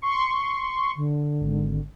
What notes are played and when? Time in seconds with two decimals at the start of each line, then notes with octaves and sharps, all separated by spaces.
0.02 C6 C#6
0.96 D3
1.41 G#1